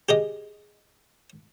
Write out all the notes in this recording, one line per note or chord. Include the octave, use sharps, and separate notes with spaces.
G4 G#4 D#5